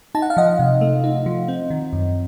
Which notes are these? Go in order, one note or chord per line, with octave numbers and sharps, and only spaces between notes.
D#4 A5
F#5
F5
F3 D#5 F#5
C3
A3
D#4
F3
C4
D#3
F#2